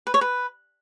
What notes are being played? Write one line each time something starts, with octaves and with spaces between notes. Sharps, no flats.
B4
C#5
B4